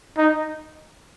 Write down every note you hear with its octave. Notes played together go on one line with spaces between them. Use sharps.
D#4